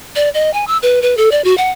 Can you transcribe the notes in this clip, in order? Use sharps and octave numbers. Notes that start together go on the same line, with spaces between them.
D5
D#5
G#5
E6
B4
B4
A4
D5
F#4
F#5